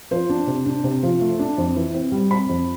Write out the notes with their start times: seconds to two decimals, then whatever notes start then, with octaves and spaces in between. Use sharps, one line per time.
0.11 F3 C5
0.30 D4
0.47 C3
0.66 D4
0.84 C3
1.03 F3
1.21 A3
1.39 D4
1.58 F2
1.76 E3
1.94 C4
2.12 G3
2.31 C4 B5
2.49 F2